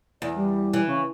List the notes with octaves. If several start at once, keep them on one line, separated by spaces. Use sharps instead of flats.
E2 D5
G3
E3
C#3